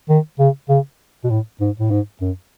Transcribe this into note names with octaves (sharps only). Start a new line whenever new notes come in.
D#3
C#3
C#3
B2
A2
G#2
A2
G#2
F#2